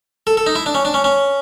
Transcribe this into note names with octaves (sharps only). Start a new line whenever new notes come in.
A4
A4
D#4
E4
D4
C#4
D4
C#4
C#4